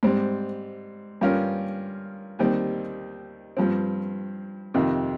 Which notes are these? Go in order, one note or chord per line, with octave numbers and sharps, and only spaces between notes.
G#2 G3 C4
G2 G3 C#4 F4 A#4
D#2 D#3 G3 C4
G2 F3 C4
F2 C3 D#3